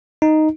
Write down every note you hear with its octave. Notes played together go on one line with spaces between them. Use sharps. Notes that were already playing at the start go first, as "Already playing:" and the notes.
D#4